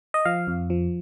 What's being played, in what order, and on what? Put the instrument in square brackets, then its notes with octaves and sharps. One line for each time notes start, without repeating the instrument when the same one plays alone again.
[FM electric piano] D#5
F3 F5
F2
F3